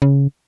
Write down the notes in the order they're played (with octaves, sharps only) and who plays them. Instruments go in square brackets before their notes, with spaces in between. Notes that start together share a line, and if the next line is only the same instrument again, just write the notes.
[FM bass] C#3